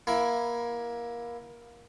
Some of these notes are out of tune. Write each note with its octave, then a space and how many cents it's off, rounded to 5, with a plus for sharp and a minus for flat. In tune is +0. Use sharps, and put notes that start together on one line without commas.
A#3 +20 E4 +10